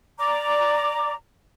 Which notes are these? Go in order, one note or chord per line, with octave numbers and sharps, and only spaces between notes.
D5 A#5 D6